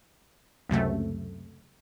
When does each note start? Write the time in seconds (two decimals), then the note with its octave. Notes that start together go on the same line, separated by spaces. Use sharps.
0.69 C#2 F#2 C3 A3